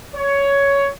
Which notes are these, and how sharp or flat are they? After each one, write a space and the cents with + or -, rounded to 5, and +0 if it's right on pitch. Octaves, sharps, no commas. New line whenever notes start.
C#5 +10